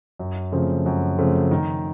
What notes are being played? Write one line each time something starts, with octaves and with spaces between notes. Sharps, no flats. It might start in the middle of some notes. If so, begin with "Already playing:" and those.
F#2
C#3 F3 A3 C4
F#2
C#3 F3 A3 C4
D#3